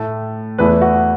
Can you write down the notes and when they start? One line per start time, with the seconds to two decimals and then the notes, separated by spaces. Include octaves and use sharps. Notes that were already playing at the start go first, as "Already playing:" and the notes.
Already playing: A2 A3
0.58 E2 E3 A3 B4
0.82 F#4